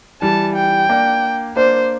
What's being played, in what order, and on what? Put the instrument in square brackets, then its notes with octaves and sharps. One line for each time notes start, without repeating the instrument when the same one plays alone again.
[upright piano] E3 G3 [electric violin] A5
[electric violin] G5
[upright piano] A#3 D4
[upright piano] A#3 D4 [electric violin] C5